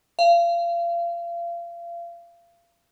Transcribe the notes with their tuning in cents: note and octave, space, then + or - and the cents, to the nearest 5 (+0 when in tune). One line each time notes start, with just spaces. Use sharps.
F5 -30